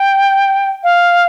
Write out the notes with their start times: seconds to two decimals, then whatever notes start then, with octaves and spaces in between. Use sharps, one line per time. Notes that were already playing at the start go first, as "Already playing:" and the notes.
Already playing: G5
0.84 F5